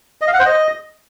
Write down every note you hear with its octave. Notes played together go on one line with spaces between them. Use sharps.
D#5
F5
F#5
C5
D#5